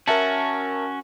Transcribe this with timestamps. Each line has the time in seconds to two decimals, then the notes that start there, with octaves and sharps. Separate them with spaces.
0.08 C#4 F#4 A#4 E5 A5